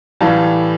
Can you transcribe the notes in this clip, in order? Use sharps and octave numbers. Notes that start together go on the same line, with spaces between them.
A2 E3 G3 F5 A5